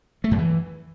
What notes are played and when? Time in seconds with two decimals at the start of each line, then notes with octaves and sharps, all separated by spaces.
0.24 A3
0.31 F#2
0.38 E3